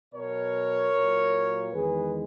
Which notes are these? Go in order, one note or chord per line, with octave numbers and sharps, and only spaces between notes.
B2 F#3 A#4 C#5
A#2 F#3
E2 D#3 G#3 G#4 B4